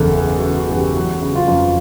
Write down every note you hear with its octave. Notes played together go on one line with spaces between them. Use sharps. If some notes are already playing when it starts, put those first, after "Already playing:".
Already playing: F#1 E2 C#3 A4
F#1 G#4
F#4
C#3
F#4
E2
G4
F#3 F#4
C#3
F4
F2